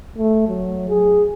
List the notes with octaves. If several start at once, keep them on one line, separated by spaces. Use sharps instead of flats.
A3
F#3
G#4